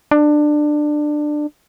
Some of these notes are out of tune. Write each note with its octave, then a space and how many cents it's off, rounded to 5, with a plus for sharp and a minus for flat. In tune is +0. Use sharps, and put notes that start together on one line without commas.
D4 +20